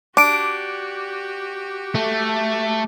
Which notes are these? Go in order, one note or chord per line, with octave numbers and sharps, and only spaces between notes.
D4 F#4 G4 D6 D7
A3